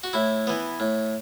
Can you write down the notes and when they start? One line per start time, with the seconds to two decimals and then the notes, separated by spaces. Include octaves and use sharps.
0.04 F#4
0.13 A2 E4
0.47 E3 B3
0.80 A2